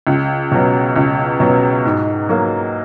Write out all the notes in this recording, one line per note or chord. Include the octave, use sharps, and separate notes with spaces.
C#2
B2 F#3
C#2
B2 F#3
G#2
F#3 A#3